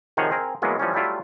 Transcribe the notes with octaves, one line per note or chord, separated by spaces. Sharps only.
C3 D#3 F3 G#4 C#5 F#5
C4 G#4 A#4
E3 F#3 G#3 A#3 B3
E3 F3 G3 C#4
F#3 G3 A3 E4 F4